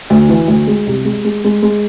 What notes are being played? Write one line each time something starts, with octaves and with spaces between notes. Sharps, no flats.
D2
E3
D2
G#3
C2
G#3
G#3
G#3
G#3